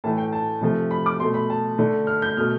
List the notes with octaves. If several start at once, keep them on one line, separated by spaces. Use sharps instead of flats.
A2 E3 A3 A5
G5
A5
C3 F3 A3
B5
D6
B2 A3 C6
B5
A5
D3 A3
F6
G6
B2 A3 F6